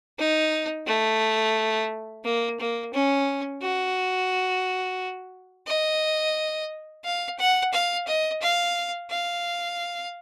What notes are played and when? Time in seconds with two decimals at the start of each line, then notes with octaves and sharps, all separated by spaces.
0.19 D#4
0.87 A3
2.24 A#3
2.60 A#3
2.94 C#4
3.62 F#4
5.67 D#5
7.04 F5
7.39 F#5
7.73 F5
8.07 D#5
8.42 F5
9.10 F5